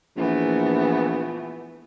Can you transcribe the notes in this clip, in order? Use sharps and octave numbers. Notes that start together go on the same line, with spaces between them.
A#1 E3 A3 B3